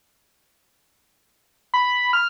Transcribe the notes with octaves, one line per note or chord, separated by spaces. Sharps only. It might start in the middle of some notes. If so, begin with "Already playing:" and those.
B5
F6